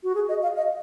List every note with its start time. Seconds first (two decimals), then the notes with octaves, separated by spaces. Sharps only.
0.04 F#4
0.15 G#4
0.29 D#5
0.42 F5
0.57 D#5